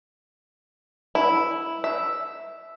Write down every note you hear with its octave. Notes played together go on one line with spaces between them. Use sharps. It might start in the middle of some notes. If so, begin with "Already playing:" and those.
E4
E5